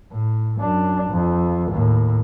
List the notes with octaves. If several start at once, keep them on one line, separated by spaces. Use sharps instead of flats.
A2
F#2 D4
F2
D#2 A2